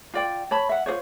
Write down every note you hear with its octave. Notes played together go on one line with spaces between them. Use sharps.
F4 D5 G5
C#5 A5 B5
E5 F#5
F4 G#4 C5 C#5